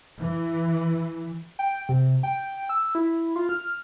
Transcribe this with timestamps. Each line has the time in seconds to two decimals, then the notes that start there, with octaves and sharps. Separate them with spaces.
0.19 E3
1.59 G5
1.89 C3
2.23 G5
2.69 E6
2.95 E4
3.36 F4
3.49 F6